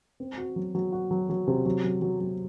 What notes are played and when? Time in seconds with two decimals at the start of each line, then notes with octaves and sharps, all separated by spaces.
0.20 C4
0.38 F#4
0.56 F#3
0.75 F#3
0.92 F#4
1.11 F#3
1.29 F#3
1.48 C3
1.66 F#3
1.84 F#3
2.02 F#3
2.20 F#3